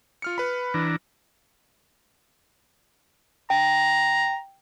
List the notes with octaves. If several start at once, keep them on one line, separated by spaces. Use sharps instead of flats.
F4 F6 C#7
B4 B5
E3 D4 A#5
G5 A#5